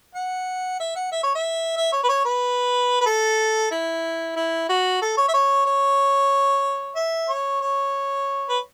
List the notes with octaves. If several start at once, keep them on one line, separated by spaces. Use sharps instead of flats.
F#5
E5
F#5
E5
C#5
E5
E5
C#5
B4
C#5
B4
B4
A4
E4
E4
F#4
A4
C#5
E5
C#5
C#5
E5
C#5
C#5
B4